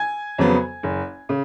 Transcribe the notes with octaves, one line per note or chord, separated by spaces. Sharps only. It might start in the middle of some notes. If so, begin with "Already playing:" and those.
Already playing: G#5 G#6
F2 C#3 F#3 B3
F#1
C#3